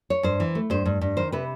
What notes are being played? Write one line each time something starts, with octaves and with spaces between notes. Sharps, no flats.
C#5
G2 C5
E3
A3
G2 C5
G2
G2
D#3 C5
C3 B4